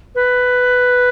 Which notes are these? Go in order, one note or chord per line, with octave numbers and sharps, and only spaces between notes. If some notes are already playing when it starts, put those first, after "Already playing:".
B4